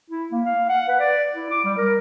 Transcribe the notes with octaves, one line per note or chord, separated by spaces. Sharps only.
E4
A#3
F5
F#5
B4
D5
E4
D6
G3
A#4